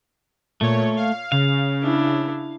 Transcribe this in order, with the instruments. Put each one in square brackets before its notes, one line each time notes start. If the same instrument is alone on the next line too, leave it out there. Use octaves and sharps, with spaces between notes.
[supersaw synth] A#2 C#5 [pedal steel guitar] A3
[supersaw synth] F5
[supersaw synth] C#3 [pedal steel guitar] F5
[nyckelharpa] D4 E4